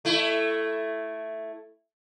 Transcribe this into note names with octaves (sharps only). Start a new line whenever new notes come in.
A3 E4